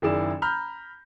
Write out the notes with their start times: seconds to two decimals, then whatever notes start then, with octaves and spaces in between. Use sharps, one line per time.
0.02 F#1 D#3 E4 G#4 D5 E7
0.42 A#5 B5 F6 G6